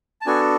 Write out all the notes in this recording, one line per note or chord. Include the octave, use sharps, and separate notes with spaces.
A5
B3 D4 F#4 A4 G#5